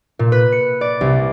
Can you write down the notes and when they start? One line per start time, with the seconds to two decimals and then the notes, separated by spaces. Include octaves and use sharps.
0.19 A#2
0.32 B4
0.52 C#7
0.81 D5
1.01 C2